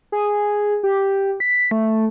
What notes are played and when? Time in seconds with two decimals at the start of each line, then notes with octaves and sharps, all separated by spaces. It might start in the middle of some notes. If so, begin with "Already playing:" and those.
0.12 G#4
0.83 G4
1.40 B6
1.71 A3